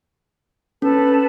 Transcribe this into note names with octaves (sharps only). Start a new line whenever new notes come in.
C#4 A4 B4 A5